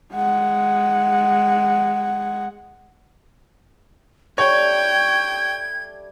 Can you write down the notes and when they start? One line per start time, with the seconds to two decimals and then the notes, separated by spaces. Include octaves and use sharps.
0.14 G#3 F#5
4.38 G3 A3 D4 C#5 G5 G#6